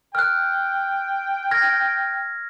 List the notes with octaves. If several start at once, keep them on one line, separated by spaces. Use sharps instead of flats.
G5 F6 F#6
F6 G#6 A#6